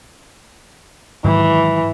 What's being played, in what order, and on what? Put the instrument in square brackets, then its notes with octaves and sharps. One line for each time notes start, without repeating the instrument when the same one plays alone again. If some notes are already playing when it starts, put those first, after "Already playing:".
[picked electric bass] G#2 D#3 F#3 [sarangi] E3